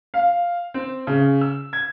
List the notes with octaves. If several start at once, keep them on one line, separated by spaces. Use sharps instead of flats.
F5
C4
C#3
E6
G#6